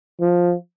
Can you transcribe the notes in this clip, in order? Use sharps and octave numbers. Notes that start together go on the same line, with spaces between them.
F3